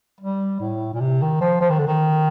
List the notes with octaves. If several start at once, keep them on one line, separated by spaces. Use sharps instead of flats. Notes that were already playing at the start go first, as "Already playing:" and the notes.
G3
A2
A#2
C3
D#3
F3
F3
D#3
D3
D#3